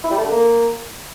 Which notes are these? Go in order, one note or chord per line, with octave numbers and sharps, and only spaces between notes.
E4
G3
A3
D3
A#3